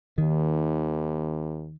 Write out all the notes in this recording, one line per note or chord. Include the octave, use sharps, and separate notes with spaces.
D#2 D#3